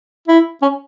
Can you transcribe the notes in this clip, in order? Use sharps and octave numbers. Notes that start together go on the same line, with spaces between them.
E4
C#4